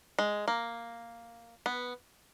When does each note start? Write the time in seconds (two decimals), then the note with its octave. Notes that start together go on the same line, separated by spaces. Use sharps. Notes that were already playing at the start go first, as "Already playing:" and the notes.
0.19 G#3
0.48 A#3
1.66 B3